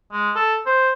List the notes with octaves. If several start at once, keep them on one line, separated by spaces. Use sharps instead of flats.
G#3
A4
C5